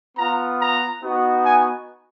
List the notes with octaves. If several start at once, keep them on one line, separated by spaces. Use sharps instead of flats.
B3 F4 A#5
A#5
B3 D#4 F#4
G#5